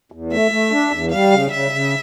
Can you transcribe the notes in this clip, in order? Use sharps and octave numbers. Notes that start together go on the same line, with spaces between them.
E2
A3 E5
A3
D4
E2
G3 F5
C#3
C#3 E5
C#3